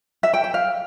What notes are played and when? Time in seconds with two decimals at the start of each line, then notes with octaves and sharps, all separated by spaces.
0.23 E5
0.33 G5
0.44 G5
0.54 F5